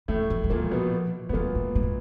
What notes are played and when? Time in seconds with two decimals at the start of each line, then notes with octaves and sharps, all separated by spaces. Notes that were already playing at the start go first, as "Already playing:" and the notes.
0.08 A2 E3 A3
0.30 F3
0.44 F#3
0.50 A#2 F3 A#3
0.71 B2 B3
1.29 G3 B3
1.33 A#2 F#3 A#3
1.55 A3
1.75 G#3
1.83 A3